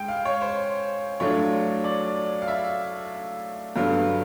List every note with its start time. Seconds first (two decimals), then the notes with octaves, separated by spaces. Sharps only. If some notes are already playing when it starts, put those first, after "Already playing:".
Already playing: G#2 G5
0.08 F5
0.25 C#5
0.41 C5
1.20 A2 F#3 A3 D4 F4 C#5
1.84 D5
2.42 F5
2.48 E5
3.76 G2 D3 F#3 B3 F5